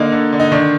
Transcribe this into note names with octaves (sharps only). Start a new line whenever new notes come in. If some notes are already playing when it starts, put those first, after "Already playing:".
Already playing: D3 A#3 D#4
D3
D3
D#4
D#3 D4